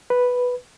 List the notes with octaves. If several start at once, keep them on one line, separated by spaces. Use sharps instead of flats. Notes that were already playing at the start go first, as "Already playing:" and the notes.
B4